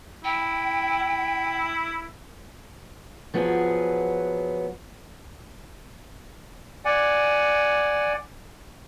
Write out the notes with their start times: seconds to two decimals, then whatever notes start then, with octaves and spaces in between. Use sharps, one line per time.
0.25 E4 G5
1.03 E4
3.34 F3 F#3 B3 G#4
6.85 D5 F#5 G#5